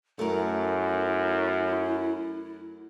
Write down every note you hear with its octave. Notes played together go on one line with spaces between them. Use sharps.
F#2 A3 E4 A#4